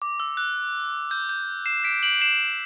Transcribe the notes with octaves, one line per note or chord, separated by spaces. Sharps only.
D6
E6
F#6
G6
G6
C7 E7
B6 D7
D7 F#7
D7
C7 E7